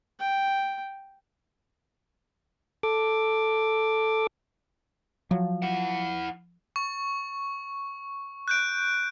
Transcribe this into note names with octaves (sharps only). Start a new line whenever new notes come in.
G5
A4 D6
F3 F#3
E4 F#5
C#6
F#6 G6 D7